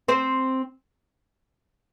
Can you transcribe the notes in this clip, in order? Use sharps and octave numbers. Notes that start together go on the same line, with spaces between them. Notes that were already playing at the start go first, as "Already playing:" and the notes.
C4 C5